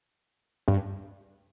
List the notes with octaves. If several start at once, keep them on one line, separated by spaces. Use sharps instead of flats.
G2